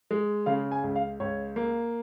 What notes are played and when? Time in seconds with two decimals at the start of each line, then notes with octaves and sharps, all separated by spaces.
0.11 G#3
0.46 C#3 F5
0.71 G#5
0.83 C#2
0.96 F5
1.20 C#2 C#5
1.56 A#3